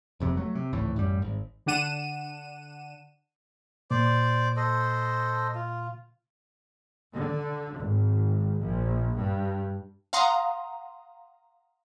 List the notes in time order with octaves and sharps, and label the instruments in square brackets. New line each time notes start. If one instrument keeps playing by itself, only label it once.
[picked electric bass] F1 F2 C3
F#3 A3
C3
G#1 C#2 A2 E3
A1 F#2 G3
G#1
[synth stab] D3 D4 F#5 D#7 E7
[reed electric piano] A#2 [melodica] C5 D5 D6
[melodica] A4 C5 D#5
F4
[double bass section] D3
G#1
A#1
G2
[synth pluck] F5 F#5 A#5 C6 D#6